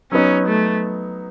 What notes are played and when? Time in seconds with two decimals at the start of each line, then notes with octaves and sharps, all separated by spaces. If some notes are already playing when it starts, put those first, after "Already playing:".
0.12 F#3 B3 C#4 D#4
0.48 A3